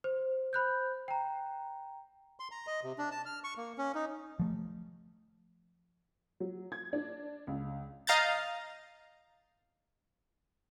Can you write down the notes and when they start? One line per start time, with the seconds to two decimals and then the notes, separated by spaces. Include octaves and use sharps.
0.04 C5
0.53 C5 B5 F#6 G6
1.08 G5 A#5
2.40 C6
2.51 A#5
2.67 D#5
2.83 C3
2.98 D4
3.11 A5
3.26 F6
3.44 C#6
3.57 A#3
3.78 C#4
3.95 D#4
4.39 F3 A3
6.40 F#3
6.72 G#6
6.93 D4
7.47 C#2
8.07 D#5 F5 A#5 G6 A6